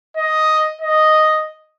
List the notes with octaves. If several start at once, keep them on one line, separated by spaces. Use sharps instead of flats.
D#5
D#5